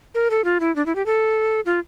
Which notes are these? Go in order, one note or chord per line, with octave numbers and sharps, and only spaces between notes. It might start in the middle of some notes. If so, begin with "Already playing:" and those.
A#4
A4
F4
E4
D4
E4
G4
A4
F4